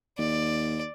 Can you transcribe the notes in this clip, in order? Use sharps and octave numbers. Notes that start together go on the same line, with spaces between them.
D#2 D5